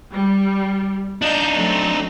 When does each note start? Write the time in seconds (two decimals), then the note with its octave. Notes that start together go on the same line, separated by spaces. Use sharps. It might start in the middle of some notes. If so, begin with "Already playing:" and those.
0.12 G3
1.22 D4 D#4 D#5 F5 G6
1.53 F#3 A3 C4